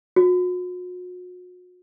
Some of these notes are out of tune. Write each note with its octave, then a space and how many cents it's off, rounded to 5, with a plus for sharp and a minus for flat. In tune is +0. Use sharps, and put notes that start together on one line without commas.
F#4 -40